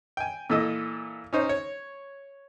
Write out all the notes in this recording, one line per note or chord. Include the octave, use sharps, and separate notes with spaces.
G5 G#5
A#2 E3 A4 D#5
C#4 D#4 C5
C#5